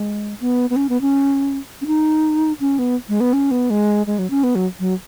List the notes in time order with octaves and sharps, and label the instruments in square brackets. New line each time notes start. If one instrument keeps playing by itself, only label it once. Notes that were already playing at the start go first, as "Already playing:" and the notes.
Already playing: [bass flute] G#3
B3
B3
C#4
B3
C#4
C#4
D#4
C#4
B3
G#3
B3
C#4
B3
G#3
G#3
F#3
C#4
B3
F#3
F#3